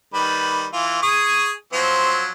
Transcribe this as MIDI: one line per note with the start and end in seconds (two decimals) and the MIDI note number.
0.14 0.66 51
0.14 0.66 55
0.14 0.66 71
0.73 1.00 52
0.73 1.00 65
1.02 1.52 68
1.02 1.52 85
1.02 1.52 87
1.73 2.32 53
1.73 2.32 54
1.73 2.32 60